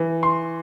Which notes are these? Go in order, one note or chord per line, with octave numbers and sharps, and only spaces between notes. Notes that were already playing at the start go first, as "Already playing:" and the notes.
Already playing: E3
C6